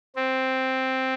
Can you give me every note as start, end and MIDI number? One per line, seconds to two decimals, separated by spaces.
0.16 1.14 60